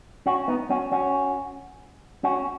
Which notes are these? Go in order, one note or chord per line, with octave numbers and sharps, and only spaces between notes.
C#4 F#4
B3 D#4
C#4 F#4
C#4 F#4
C#4 F#4